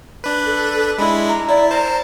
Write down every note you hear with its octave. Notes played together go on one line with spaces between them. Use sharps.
D4 B4
A4
G#3 D4 E4 B5
A#5
E4 D5
C5 A5 A#5